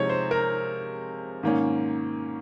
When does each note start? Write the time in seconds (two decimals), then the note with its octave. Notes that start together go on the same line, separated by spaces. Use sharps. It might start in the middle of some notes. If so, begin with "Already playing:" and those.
Already playing: C3 F3 G#3 D#4 C#5
0.09 C5
0.31 A#4
1.43 G#2 D#3 A#3 C#4